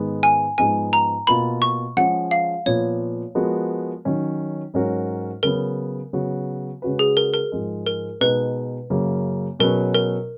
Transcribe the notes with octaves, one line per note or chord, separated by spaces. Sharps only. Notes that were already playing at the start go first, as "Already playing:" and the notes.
Already playing: G#2 D#3 G#3 B3
G#5
G#2 F3 G#3 B3 D#4 G#5
A#5
B2 A#3 F4 B4 B5
C#6
F3 G#3 C#4 G#4 F#5
F5
A#2 F3 B3 C#5
F3 G#3 B3 F#4 A#4
D#3 F#3 C#4
G#2 F#3 C#4 F#4 A#4
C#3 F#3 B3 A#4
C#3 F#3 B3 F#4
C#3 G#3 C#4 F#4 B4
G#4
A#4
A#4
G#2 F3 G#3
A#4
B2 G#3 D#4 B4
F#2 C#3 F#3 A#3
B2 F#3 C#4 G#4 A#4 B4
A#4